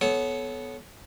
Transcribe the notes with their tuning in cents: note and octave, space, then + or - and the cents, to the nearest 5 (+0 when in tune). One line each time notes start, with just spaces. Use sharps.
B3 +0 A4 -30 C#5 +0